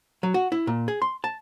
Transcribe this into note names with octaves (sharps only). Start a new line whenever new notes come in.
F#3
F#4
E4
A#2
G#4
C6
A5